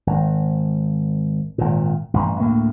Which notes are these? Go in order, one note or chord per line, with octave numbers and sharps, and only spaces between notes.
G#1
G#1 A#2
A1 G2
D2 A2 A#3